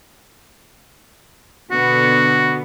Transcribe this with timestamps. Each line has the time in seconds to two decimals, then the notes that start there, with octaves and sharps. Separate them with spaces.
1.71 B2 D3 B3 F#4